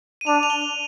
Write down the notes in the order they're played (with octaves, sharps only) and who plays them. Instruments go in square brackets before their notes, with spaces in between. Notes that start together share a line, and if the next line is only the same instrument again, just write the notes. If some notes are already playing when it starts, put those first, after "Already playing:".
[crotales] D#7
[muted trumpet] D4 [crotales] F7
[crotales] D#7
F7
G7
F7